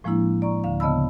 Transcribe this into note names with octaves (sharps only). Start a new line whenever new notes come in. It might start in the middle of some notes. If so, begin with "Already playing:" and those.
A2 F3 G#3 A#3 D4 E4
D5 A#5 C#6
D2 D3 F5
C#3 B3 D#5 A5 B5 E6